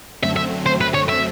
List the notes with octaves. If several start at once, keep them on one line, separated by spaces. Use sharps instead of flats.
F#2 D3 F#3 A3 C4 E5
E5
C5
B4
C#5
E5